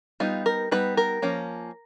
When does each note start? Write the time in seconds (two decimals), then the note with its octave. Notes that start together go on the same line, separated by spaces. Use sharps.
0.20 G3 B3 D#4 F4
0.46 A#4
0.71 G3 B3 D#4 B4
0.97 A#4
1.22 F3 A#3 C#4